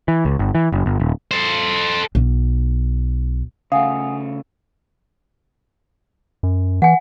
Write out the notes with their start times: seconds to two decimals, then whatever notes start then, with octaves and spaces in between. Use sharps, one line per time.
0.08 E3
0.25 C#2
0.39 G1
0.55 E3
0.72 F#1
0.86 G1
1.00 D#1
1.31 A4 C5
2.15 B1
3.72 C#3 A3 F5 F#5 G#5 D#6
6.43 F#2
6.82 E3 F#5 G#5